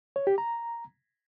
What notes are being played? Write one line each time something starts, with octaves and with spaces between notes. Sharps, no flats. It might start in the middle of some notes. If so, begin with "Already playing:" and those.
C#5
G4
A#5